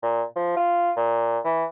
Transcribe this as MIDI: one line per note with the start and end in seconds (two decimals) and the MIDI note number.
0.02 0.23 46
0.36 0.52 53
0.57 0.91 65
0.96 1.39 46
1.44 1.65 52